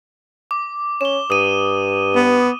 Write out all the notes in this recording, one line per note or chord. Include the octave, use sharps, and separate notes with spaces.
D6
C#4 E7 G7
G2 D#6 D#7
B3